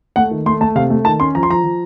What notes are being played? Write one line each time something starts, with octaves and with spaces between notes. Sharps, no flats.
A3 F#5
D#3
A3 C6
A3 A5
C3 F5
A3
D#3 A5
C#4 C6
F3 A#5
C6
F3 A#5
F3